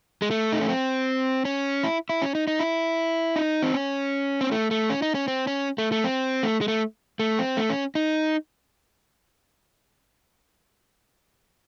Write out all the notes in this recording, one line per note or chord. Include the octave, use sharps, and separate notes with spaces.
G#3
A3
D#4
C#4
C4
C#4
E4
E4
C#4
D#4
D#4
E4
D#4
C4
C#4
C4
A3
A3
C#4
D#4
C#4
C4
C#4
A3
A3
C4
A3
G#3
A3
A3
C4
A3
C#4
D#4